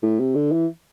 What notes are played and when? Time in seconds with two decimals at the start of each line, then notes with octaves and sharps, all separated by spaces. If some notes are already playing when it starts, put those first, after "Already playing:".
0.03 A2
0.20 C3
0.35 D3
0.52 E3